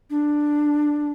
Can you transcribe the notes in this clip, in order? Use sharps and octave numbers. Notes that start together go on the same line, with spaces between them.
D4